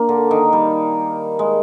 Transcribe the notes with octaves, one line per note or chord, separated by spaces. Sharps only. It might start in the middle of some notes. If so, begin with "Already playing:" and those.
Already playing: A#3 D4
D3
D#3
G3
G#3